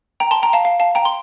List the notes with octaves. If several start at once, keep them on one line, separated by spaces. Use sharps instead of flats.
G5 A#5
A5 C6
G5 A#5
F5 A5
F5
F5 A5
G5 A#5
C6